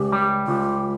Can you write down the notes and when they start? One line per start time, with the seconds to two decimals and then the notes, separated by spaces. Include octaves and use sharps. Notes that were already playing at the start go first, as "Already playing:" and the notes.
Already playing: C#2 G4
0.12 G3
0.47 C#2 F4